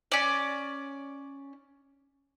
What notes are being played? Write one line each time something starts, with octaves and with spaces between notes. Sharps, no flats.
C#4 D5